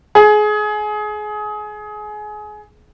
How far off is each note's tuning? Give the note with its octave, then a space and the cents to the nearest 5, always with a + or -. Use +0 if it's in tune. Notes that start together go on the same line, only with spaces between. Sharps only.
G#4 +25